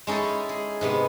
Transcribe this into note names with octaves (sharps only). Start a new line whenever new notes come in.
G#3 C#4 D#4 E4 A4
G#4
G#2 C3 B3